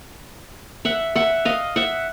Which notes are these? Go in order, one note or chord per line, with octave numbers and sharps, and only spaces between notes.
E5 F#5
E5 F#5
D#5 F5
E5 F#5